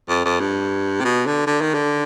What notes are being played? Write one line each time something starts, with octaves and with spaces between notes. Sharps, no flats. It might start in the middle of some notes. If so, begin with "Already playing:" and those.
F2
F2
G2
C3
B2
D3
D3
D#3
D3